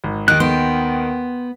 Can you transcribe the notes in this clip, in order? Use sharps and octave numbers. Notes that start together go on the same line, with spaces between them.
G#1
D#2 D#3 D#4 F#6
B3 G5 C6